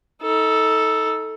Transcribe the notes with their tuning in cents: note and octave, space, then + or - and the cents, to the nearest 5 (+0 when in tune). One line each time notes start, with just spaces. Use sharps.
D#4 +30 A4 +0